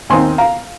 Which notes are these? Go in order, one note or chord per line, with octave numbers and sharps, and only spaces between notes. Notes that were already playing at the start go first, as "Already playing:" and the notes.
D#2 D#3 C4 D#4 G#5 C6
F5 A#5